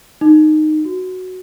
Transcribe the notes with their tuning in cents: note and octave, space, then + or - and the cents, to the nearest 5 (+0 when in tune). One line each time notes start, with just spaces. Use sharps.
D#4 -15
F#4 +0